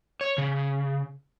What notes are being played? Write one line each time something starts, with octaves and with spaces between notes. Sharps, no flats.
C#5
C#3